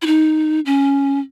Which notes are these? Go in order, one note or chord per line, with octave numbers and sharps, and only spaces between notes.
E4
D#4
C#4